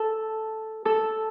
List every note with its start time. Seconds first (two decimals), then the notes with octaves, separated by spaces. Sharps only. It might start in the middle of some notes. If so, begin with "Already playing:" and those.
Already playing: A4
0.85 A4